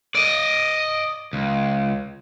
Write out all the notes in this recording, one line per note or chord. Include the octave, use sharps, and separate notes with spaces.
D5 D#5
C#2